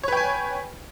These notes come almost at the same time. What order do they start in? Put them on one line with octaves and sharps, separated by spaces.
C#5 B4 G5 G#5